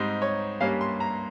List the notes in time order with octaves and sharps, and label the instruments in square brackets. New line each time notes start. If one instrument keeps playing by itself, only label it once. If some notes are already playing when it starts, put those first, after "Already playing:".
Already playing: [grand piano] G#2 G3 C4 D#4 C5
C#5
G2 G3 A#3 C#4 F5
C6
A#5